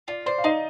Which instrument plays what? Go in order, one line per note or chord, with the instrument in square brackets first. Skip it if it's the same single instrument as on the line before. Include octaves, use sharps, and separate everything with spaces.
[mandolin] F4 [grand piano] D5
[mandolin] C5 [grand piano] D5
[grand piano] F5
[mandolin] D#4 [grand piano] D#5